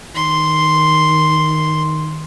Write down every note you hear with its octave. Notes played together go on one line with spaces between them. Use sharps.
D#3 C6